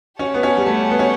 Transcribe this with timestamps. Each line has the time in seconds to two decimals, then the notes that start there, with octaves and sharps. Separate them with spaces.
0.19 C#4 G4 C#5 F#5 A5
0.34 B3
0.43 C#4
0.57 G3
0.66 A3
0.90 B3
0.99 C#4